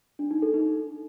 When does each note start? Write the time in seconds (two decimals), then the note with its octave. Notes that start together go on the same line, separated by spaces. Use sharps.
0.19 D4
0.31 D#4
0.42 A4
0.54 D#4